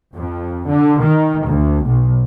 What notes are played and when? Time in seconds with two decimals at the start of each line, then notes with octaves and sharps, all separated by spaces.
0.15 F2
0.67 D3
1.02 D#3
1.46 D2
1.85 B1